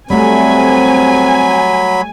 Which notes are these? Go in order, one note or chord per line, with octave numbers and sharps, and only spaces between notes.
F#3 G3 A3 C4 G#5 B5